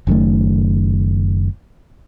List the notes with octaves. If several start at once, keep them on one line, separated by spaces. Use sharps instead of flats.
F#1 F#2 D#3 A3